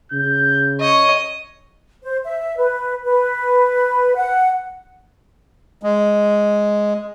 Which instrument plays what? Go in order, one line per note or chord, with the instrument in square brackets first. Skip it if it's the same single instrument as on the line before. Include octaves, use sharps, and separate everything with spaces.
[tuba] C#3 [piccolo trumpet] G6
[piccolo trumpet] C#5 [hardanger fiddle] D#5
[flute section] C5
E5
B4
B4
F#5
[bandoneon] G#3